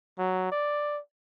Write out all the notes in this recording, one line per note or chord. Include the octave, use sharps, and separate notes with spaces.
F#3
D5